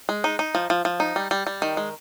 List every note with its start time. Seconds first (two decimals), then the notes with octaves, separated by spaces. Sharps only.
0.09 G#3
0.24 D#4
0.39 D#4
0.55 F3
0.70 F3
0.85 F3
1.00 D#4
1.16 G3
1.31 G3
1.47 G3
1.62 D#3
1.77 G#3